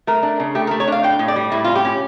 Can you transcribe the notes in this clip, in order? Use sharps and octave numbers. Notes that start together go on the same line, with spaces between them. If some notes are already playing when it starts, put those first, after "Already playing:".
A3 A#4
D4
C#3
A3 G4
A#4
A3
C#5
D4 F5
A2 G5
A2
D5
G3
A2 E4
C#4 F4
G4
C#4